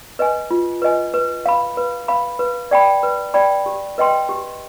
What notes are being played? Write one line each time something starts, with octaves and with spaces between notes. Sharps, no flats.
B4 D#5 G#5
F4
B4 D#5 G#5
B4
F5 B5
B4
F5 B5
B4
D5 G5 B5
B4
D5 G5 B5
G4
B4 D#5 G5 C6
G4